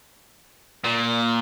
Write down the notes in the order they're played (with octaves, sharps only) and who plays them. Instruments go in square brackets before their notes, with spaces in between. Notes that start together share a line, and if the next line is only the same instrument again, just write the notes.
[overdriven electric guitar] A#2